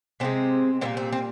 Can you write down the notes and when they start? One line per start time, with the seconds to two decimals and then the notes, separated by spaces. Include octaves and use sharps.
0.20 C3 F3 G#3 C4
0.81 A#2 G3 A#3 C4
0.97 C4
1.12 C4